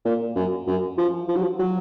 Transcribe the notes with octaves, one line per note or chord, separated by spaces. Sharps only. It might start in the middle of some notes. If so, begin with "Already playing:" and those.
A#2
F#2
F#2
F3
F3
F#3
F3
F#3